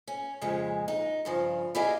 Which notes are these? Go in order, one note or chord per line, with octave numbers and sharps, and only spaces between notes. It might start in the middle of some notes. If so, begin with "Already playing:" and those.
C#4
F2 A#2 C#3 G#3
D#4
G2 C#3 F3
E4 G4 G#4 D5 D#5 F5